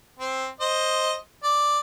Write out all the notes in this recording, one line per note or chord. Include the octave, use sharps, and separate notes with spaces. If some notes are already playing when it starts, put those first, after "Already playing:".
C4
C5 D#5
D5